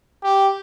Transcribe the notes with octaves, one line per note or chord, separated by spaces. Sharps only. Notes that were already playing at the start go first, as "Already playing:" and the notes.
G4